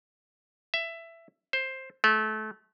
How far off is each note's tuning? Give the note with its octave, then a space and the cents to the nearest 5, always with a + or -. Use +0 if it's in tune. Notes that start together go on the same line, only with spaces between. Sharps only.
E5 +15
C5 +10
A3 -25